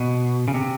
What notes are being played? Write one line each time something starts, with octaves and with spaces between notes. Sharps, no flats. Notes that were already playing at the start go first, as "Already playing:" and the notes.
Already playing: B2
C#3
C3